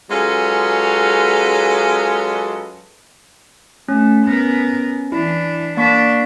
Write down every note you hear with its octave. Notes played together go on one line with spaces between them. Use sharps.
F#3 G#3 C#4 F4 A4 B4
A3 C#4
B3 A#4
E3 D4 E4
A#3 D4 C#6 B6